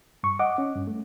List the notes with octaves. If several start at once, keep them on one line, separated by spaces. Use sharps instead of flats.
G2 C#6
D#5 F#5 D6
C#4
G2
A3